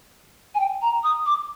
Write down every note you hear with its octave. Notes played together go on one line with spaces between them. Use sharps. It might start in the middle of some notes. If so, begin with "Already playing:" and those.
G#5
G5
A#5
D#6
D6